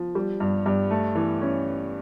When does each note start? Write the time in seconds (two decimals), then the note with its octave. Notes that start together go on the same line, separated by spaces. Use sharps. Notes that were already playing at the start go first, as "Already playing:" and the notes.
Already playing: F3
0.15 G3
0.40 G2
0.66 G2
0.91 A3
1.15 E3
1.42 C#4